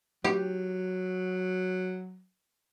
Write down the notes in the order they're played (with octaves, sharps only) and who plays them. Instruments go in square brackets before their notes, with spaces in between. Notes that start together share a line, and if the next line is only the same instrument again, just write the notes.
[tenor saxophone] F#3 [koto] G4